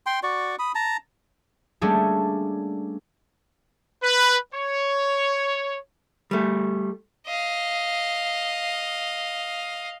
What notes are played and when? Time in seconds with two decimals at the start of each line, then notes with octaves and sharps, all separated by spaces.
0.06 G5 C6
0.23 F#4 D5 C#6
0.59 B5 D#6
0.75 A5 A#5
1.81 G3 A3 A#3 C#4 D4 G#4
4.03 B4
4.53 C#5
6.31 G3 A3
7.27 D#5 F5